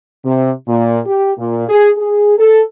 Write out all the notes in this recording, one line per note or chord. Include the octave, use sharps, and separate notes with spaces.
C3
A#2
G4
A#2
G#4
G#4
A4